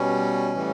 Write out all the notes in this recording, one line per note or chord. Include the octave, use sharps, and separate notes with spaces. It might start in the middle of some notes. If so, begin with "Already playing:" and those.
Already playing: B2 G3 C#4
A2 E3 G3